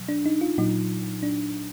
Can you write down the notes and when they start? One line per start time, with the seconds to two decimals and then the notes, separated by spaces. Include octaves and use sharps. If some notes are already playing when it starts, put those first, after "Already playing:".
Already playing: B2 F#3
0.08 D4
0.26 D#4
0.41 F4
0.58 A#2 F#3 D#4
1.23 D4